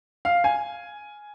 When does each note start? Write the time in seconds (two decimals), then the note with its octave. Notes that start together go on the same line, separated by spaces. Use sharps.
0.25 F5
0.44 G#5